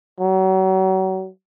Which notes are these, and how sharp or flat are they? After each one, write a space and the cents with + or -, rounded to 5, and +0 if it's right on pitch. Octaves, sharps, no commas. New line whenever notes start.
F#3 +35